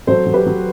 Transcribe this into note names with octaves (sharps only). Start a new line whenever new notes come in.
F#3 A4 C5
F#3
G4 B4
F#3